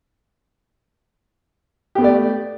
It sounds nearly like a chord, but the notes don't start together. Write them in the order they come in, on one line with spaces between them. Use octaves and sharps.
G4 B3 A3 D5